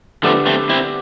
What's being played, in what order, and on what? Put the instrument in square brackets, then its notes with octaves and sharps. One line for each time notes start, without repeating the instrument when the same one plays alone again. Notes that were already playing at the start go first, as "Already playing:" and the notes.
[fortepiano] D3 G3 B3 D4 [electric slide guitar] F3 A3
[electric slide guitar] A3 C4
C4 E4